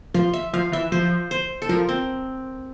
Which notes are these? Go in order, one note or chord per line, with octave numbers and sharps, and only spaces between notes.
F3 F4
E5
F3 F5
E3 E5
F3 C5
C5
A4
F3 A#4
C4